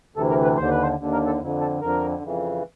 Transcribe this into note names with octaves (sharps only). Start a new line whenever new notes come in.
D2 C3 E3 A4
A#4
B4
D#2 D3 C5
B4
C5
D#2 D3
A#4
A4
F2 D3
A4
F2 D3 A#4
F2 C#3 E3